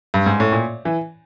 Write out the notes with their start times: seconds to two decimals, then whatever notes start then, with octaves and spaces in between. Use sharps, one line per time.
0.14 G2
0.26 G#2
0.40 A2
0.52 A#2
0.85 E3